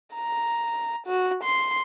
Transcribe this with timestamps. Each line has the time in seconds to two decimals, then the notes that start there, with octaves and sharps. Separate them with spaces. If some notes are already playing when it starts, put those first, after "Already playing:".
0.14 A#5
1.07 F#4
1.44 C6